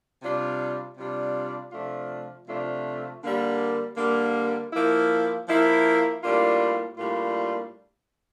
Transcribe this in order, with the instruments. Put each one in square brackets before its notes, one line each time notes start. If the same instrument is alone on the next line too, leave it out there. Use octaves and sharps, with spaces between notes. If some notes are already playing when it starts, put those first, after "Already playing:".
[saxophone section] C3 G3 D4 F4
C3 G3 D4 F4
C3 F3 A3 D4 F4
C3 F3 A3 D4 F4
D3 G3 A#3
D3 G3 A#3
F3 A#3 E4
F3 A#3 E4
A2 G3 A#3 D4 F4
A2 G3 A#3 D4 F4